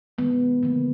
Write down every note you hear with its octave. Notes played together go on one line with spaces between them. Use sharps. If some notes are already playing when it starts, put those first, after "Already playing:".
D#3 G#3 B3
D3 F3 A#3